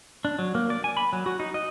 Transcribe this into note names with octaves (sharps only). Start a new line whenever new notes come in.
D4
F#3
A#3
D5
G#5
B5
F#3
F#4
D#4
D#5